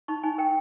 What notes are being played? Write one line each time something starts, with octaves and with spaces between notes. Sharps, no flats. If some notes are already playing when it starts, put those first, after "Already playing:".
D#4 C#6
D#4 G#5
A#4 G5